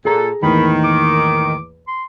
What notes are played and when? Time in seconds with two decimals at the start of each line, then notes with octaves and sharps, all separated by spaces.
0.05 A#2 G#4 A4 A#5
0.43 E2 A2 D#3 A#3 B5
0.84 D6
1.87 C6